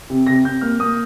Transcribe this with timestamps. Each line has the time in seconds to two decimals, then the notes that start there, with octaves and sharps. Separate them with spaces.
0.10 C3
0.27 C3 A#6
0.44 C3 G6
0.61 A#3 F6
0.79 A#3 D#6